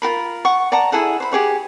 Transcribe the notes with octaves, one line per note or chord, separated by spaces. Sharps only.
F4 F#4 A#4 B5
F#5 C#6
D5 F#5 A5 A#5
E4 G#4 A4 F#5
C5 B5
G4 G#4 C#5 F#5